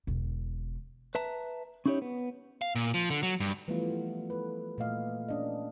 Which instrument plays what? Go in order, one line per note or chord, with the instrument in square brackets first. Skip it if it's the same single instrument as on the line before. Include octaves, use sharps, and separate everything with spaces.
[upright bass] E1 D3
[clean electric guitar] B4 E5 A5 A#5
C#4 D#4 E4 G4 A#4 C#5
B3
[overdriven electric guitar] F5
A#2
F3
D3
F#3
G2
[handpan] E3 F3 G3 A3 B3 F4
A4 B4
A#2 A3 D#5 F5
C#4 D4 D#5